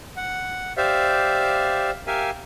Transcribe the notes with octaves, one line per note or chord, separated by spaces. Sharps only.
F#5
G4 C5 D5 E5 F5
G4 A#4 E5 F5 G#5